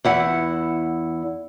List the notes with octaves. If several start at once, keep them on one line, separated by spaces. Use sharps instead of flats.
E2 E4 F#5